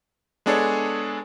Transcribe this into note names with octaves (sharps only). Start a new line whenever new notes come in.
G#3 B3 D4 G#4 A4 C#5